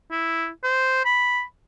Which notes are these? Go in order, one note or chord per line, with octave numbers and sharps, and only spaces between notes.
E4
C5
B5